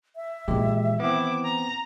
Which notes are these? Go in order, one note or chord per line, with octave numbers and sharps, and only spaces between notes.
E5
A#2 D#3 E3 G#3 G4
B3 C4 E4 D6
A#5